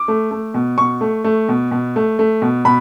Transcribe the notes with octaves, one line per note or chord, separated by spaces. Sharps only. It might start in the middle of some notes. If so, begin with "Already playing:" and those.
Already playing: D6
A3
A3
B2
B2 C#6
A3
A3
B2
B2
A3
A3
B2
B2 B5